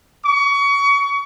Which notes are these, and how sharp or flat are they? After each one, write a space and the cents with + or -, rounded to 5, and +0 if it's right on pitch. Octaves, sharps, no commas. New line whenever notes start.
C#6 +30